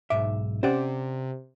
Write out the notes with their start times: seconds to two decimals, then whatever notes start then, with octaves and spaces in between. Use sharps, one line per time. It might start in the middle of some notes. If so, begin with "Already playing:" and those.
0.10 B1 G#2 E5 D6
0.63 C3 C#4 G4 C5 D5 F#5